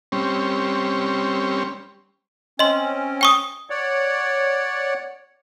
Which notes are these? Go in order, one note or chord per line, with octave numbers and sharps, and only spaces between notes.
G3 C4 C#4
C4 C#4 D#5 C6
G5 C#6 D#6
C#5 D5 F#5